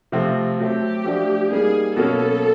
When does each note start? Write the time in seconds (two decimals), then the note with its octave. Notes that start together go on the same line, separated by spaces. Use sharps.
0.12 C3 F3 A3 C4
0.58 F#3 A3 C4 G4
1.05 F3 A3 D4 F#4
1.51 G3 A#3 D#4 G#4
1.96 B2 F#3 A#3 C#4 A4